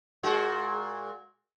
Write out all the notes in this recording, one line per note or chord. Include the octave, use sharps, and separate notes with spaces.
A#2 G#3 F#4